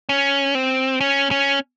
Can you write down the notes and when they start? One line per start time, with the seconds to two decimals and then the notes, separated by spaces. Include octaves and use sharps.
0.09 C#4
0.55 C4
1.01 C#4
1.31 C#4